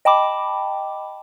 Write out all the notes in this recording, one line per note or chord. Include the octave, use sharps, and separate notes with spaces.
D#5 G5 A5 B5 D6